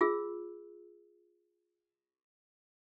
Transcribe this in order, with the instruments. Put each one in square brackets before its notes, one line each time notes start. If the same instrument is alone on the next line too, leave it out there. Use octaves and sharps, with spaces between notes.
[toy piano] F4 G#4 E6